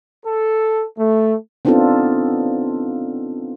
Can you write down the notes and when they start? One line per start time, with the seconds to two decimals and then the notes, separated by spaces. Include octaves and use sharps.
0.25 A4
0.98 A3
1.65 B3 C4 D4 D#4 F4 A4